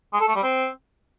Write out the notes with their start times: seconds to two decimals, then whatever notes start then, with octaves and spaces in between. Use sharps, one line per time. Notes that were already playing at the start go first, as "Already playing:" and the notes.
0.13 G#3
0.21 A4
0.28 A3
0.36 G3
0.43 C4